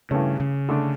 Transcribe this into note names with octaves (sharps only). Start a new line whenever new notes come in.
G2 C#3 E3 A3 C#4
C#3
D3 A3 D4